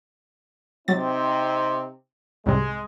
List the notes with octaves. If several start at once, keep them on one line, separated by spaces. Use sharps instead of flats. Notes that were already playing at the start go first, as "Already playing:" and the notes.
C3 F#3 C4 D#4 A6
C2 G#2 C3 G#3